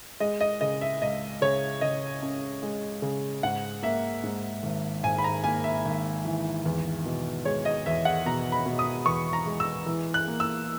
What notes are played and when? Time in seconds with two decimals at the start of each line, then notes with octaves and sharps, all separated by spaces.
0.20 G#3 D#5
0.41 D#5
0.61 C#3 D#5
0.81 E5
1.02 C#2 D#5
1.41 C#3 C#5
1.81 C#3 D#5
2.22 C#4
2.63 G#3
3.02 C#3
3.43 G#2 F#5
3.83 A#3 E5
4.24 G#2
4.63 G#1
5.03 G#1 G#5
5.18 B5
5.24 A#5
5.44 A#3 G#5
5.64 E5
5.85 G#1
6.25 E3
6.65 E2
7.06 B2
7.45 G#3 C#5
7.65 D#5
7.86 E2 E5
8.05 F#5
8.26 B2 A#5
8.52 B5
8.66 B2
8.79 D#6
9.06 E2 C#6
9.33 A#5
9.46 G#3
9.60 E6
9.86 E3
10.14 F#6
10.28 A#3
10.40 E6